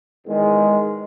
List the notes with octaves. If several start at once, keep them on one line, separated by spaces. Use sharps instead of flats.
E2 D#3 G#3